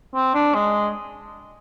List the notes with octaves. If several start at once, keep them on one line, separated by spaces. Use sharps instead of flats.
C4
D4
G#3